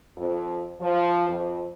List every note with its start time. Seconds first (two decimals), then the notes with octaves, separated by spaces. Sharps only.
0.17 F2
0.80 F3
1.28 F2